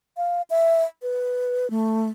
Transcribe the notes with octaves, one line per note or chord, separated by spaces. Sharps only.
F5
E5
B4
A3